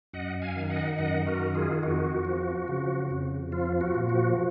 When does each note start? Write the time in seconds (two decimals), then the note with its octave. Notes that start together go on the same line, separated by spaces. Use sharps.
0.13 F#2 D#5 F#5
0.42 F5 G#5
0.56 D#3
0.70 D#5 F#5
0.98 F#2 D#5 F#5
1.27 F#4 A#4
1.40 D#3
1.55 F4 G#4
1.83 F2 F#4
2.25 F3
2.68 C#3
3.10 F2
3.52 F3 F4
3.81 F#4
3.95 A#2
4.09 F#4